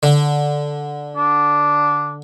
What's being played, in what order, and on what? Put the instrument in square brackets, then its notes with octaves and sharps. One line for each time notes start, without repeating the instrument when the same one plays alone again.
[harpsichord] D3
[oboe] D4